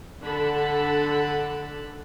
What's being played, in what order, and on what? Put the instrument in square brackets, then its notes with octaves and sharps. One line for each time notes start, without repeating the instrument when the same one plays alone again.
[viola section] D3 D4 A4 F#5 A5 B5